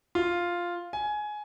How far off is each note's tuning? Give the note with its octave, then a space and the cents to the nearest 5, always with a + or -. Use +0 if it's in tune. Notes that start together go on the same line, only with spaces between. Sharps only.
F4 +0
G#5 +15